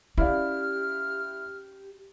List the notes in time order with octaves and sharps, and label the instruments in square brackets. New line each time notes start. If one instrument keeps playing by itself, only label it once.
[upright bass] C#4 [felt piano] E4 D5 F5 [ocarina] G4 [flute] F6